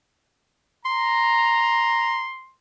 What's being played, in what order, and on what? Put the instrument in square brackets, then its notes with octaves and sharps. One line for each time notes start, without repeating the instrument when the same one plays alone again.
[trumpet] A#5 [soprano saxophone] C6